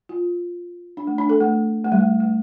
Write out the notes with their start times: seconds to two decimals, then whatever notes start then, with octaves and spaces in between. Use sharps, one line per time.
0.09 F4
0.97 D4
1.07 A3
1.18 D4
1.29 A4
1.41 A3
1.85 A3
1.92 G3
1.99 A3
2.20 A3